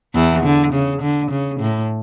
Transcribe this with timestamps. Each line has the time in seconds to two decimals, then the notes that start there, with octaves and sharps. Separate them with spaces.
0.15 E2 E3
0.44 D3
0.73 C#3
1.02 D3
1.31 C#3
1.60 A2